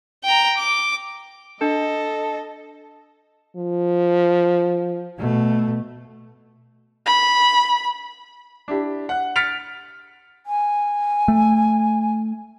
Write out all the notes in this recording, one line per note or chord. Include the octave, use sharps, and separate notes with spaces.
G5 A#5
D6
D4 A4 D#5
F3
B2 A3
B5
D4 E4 G4
F#5 F#6
F6 A6 B6 C#7 D7 F7
G#5
A3